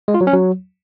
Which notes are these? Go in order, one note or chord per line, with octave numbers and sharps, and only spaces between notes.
G#3
F4
F#3
C#4
F#3